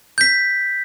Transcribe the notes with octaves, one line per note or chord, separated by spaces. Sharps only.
G6 B6